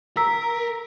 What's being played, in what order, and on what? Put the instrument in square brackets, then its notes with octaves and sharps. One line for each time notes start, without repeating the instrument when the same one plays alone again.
[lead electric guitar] A#4 [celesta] A#5 E6 B6